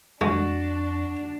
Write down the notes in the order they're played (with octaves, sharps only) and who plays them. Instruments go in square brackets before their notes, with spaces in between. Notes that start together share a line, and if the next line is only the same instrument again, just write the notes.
[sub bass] F2 [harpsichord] G#3 [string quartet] D4 [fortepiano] F#4